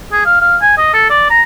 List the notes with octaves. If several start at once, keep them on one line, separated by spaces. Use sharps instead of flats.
G#4
F5
F5
G#5
D#5
A4
D5
A#5